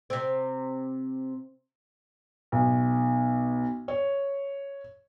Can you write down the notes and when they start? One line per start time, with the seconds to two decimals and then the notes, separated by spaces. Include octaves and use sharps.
0.10 C3 C4
2.52 B1
3.88 C#5